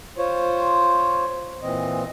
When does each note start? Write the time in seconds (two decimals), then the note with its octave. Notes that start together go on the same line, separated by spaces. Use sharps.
0.18 F4 C5 C#5
1.62 A#2 E3 C4 D#5